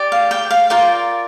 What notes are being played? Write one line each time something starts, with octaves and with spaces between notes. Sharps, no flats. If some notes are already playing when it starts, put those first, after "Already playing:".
Already playing: G4 D5
F5
G5
F5
F4 A#4 D5 G5